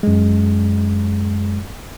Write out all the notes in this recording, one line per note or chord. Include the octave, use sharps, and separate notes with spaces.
F#2 G#3